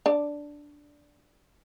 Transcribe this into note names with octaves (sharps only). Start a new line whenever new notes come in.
D4 D5